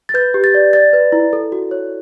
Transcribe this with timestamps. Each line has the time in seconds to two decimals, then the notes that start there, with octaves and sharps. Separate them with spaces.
0.09 A6
0.14 B4 G6
0.34 G4
0.44 A6
0.54 D5
0.73 D5 A6
0.93 B4
1.12 E4
1.33 A4
1.52 F#4
1.71 C#5